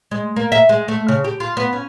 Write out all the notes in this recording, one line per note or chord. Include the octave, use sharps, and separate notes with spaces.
G#3
A#3
E5
G#3
A3
C#3
G4
F4
B3
C#4